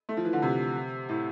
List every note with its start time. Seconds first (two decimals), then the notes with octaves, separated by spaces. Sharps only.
0.09 A3
0.17 F3
0.25 E3
0.33 D3
0.42 C3
1.09 A2